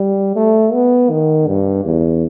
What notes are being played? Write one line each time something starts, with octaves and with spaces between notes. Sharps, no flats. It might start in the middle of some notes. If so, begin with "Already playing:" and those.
Already playing: G3
A3
B3
D#3
G2
E2